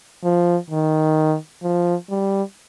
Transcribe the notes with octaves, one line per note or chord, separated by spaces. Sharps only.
F3
D#3
F3
G3